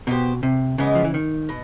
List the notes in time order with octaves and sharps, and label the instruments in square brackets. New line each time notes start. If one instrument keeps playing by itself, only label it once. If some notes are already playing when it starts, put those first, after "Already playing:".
[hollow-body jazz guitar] B2 [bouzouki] B3 E4 G4 C5
[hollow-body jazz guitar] C3
[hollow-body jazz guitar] C#3 [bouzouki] E3 G#3 B3
[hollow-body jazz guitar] F3
E3
D#3
[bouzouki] B2